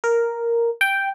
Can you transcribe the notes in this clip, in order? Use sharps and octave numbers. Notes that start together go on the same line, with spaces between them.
A#4
G5